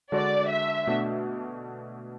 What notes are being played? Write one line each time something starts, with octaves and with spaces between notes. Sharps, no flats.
D3 G#3 D4 F#4 D5
E5
B2 A3 D4 F#4